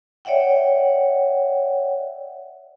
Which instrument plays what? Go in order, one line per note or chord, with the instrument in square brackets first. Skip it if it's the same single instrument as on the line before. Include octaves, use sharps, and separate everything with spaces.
[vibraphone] C#5 D5 E5 F#5 G5